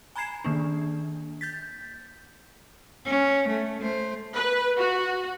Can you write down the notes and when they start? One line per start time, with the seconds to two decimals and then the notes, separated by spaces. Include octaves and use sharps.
0.16 G#5 A#5 B5 G#6 C7 E7
0.45 D#3 A#3 D4
1.41 G6 A6 B6
3.05 C#4
3.48 A3
3.81 A3 C5
4.35 B4
4.77 F#4